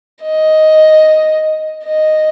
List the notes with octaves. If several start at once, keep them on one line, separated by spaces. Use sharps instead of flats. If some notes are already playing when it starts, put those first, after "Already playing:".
D#5
D#5